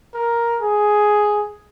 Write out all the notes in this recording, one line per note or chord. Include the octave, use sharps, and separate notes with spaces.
A#4
G#4